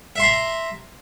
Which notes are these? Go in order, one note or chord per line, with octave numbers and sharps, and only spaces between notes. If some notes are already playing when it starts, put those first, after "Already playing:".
E5 A#5 C6